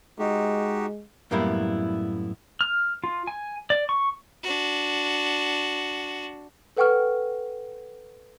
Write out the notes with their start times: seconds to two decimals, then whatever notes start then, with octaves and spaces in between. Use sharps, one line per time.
0.19 G#3 D#4 F#4 G4
1.31 F#2 A2 G3 A#3 B3 E4
2.61 F6
3.04 F4
3.27 G#5
3.70 D5
3.89 C#6
4.43 D4 F#4
6.77 A4 B4 F#5 G5 C#6 F6